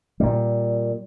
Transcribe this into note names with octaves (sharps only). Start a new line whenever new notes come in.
A#2 G3